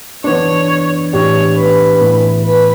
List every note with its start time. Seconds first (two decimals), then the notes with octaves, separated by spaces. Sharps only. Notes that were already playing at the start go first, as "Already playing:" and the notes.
0.24 E3 B3 D4 C#5
1.12 A2 E3 B3 D4 G4 C#5
1.56 B4
2.01 A2 E3 B3 E4
2.45 B4